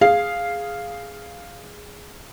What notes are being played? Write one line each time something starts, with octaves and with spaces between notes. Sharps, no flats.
G#4 F5